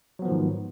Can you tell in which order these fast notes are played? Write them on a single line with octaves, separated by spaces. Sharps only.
F#3 B3 F3 D#3 G#2